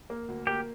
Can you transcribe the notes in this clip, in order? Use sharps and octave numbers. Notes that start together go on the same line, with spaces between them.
A#3
D2
A#3 G4